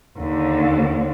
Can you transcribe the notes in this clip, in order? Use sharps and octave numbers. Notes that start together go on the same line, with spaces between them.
D#2 D3